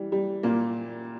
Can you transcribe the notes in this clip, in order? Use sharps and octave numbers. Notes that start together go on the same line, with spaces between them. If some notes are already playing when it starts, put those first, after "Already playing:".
Already playing: E3 G3
G3
A#2 A#3